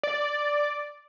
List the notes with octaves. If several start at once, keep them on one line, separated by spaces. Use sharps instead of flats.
D5